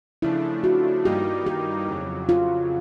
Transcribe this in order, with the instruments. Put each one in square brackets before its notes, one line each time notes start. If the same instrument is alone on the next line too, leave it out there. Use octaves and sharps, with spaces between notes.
[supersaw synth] C#3 F3 A3 D4 [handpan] E4
[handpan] F#4
[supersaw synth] G2 D#3 G3 A#3 D#4 [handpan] G4
[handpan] G4
[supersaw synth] F2 C#3 F#3
[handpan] F4